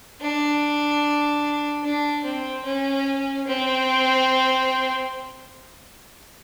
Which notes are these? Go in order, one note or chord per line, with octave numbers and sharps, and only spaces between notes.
D4
D4
C4
C#4
C4